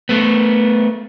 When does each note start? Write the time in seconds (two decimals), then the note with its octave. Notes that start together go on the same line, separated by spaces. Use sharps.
0.09 A3 B3